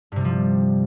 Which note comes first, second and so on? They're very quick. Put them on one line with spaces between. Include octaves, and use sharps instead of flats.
G2 C3 G3 F3